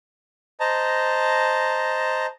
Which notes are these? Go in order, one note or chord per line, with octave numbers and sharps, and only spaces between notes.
C5 D#5 A5 A#5